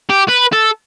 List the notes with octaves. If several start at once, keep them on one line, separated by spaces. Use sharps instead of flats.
G4
B4
A4